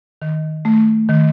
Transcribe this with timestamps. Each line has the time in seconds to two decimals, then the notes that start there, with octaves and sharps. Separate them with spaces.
0.22 D#3
0.65 A3
1.09 D#3